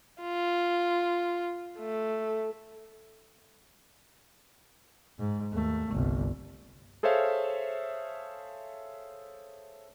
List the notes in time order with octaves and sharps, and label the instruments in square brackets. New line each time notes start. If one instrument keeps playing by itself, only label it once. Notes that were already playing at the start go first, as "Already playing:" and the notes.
[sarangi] F4
A3
[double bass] G#2
D#2 A3
G1 C2
[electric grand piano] G#4 A4 C5 C#5 E5 F5